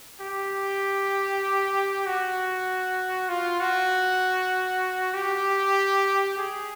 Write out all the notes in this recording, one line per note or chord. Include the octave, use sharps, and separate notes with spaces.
G4
F#4
F4
F#4
G4
G#4